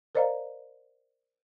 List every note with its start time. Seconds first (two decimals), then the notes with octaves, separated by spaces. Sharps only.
0.15 A#4 C5 D5 D#5 F5 A#5